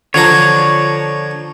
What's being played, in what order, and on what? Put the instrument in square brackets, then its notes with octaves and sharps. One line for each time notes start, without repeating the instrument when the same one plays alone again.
[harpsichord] D3 F3 A#5 [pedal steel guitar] C#5